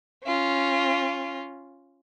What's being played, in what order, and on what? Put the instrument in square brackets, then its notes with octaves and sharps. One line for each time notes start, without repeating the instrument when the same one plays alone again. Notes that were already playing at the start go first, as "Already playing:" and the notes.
[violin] C#4 F4